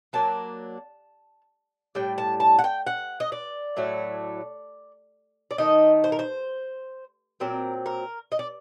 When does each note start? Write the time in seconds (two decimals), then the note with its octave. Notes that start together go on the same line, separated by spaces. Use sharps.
0.13 F#3 A#3 D4 A5
1.95 A2 G3 D4 G5
2.18 A5
2.40 A5
2.59 F#5
2.64 G5
2.87 F#5
3.20 D#5
3.32 D5
3.77 A2 F#3 A3
5.51 D5
5.58 D#3 A3 D#4 D#5
6.04 C5
6.12 A#4
6.19 C5
7.40 A#2 F#3 C4 A#4
7.86 A#4
8.32 D#5
8.39 D5